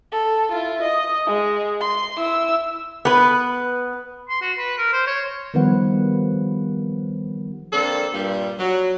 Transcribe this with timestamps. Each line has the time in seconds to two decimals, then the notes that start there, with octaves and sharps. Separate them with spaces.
0.12 A4
0.52 E4 F4
0.83 D#5
1.26 G#3
1.80 C6
2.16 E4 E6
3.05 B3 B4
4.29 C6
4.41 F#4
4.58 B4
4.78 A#4
4.93 C5
5.07 C#5
5.54 D#3 F3 G3 B3 B4 F#5
7.72 A#3 C4 D4 A4
8.13 G2 A#2 G3
8.59 F#3